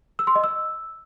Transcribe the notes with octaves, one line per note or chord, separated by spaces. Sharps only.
E6
C6
D#5
E6